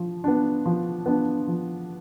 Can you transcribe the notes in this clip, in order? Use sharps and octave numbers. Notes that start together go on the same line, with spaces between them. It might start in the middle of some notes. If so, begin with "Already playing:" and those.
Already playing: F3
B3 D4
F3
B3 D4
F3